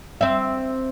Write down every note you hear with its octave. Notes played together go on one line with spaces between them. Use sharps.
C4 E5